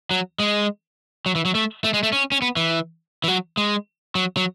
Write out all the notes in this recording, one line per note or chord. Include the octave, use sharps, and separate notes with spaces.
F#3
G#3
F#3
E3
F#3
A3
A3
G#3
A3
C#4
C#4
B3
E3
E3
F#3
G#3
F#3
F#3